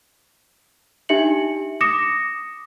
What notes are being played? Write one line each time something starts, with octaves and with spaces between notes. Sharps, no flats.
D4 D#4 G4 E5 C#7 F#7
D6 D#6 A#6 C#7 E7